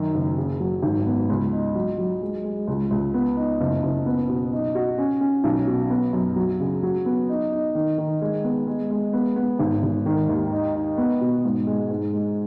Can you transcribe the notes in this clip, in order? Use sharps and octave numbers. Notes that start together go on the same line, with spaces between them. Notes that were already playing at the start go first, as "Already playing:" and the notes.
Already playing: F#2 D#3
F#1
C#3
F#3
G#1
B3
C#2
D#4
F#3
F#3
G#3
G#3
C#2
C#2
B3
D#4
F#1
F#1
B3
B2
D#4
F#4
C#4
C#4
B1
B2
B3
F#2
F#3
C#3
F#3
B3
D#4
D#4
D#3
D#3
G#3
B3
G#3
G#3
B3
B3
G#1
G#1
D#3
D#2
D#4
D#4
B3
B2
G#2
G#3
G#2
G#3